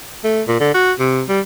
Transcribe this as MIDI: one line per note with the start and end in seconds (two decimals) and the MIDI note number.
0.24 0.42 57
0.48 0.59 46
0.60 0.72 50
0.74 0.92 66
0.99 1.23 48
1.28 1.40 55